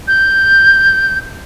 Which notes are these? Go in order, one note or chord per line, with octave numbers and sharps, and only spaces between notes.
G6